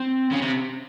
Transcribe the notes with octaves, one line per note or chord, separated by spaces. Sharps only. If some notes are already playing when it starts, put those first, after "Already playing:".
Already playing: C4
C#3
C3